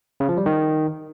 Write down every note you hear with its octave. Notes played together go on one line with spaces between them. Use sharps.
C#3
F3
G3
D#3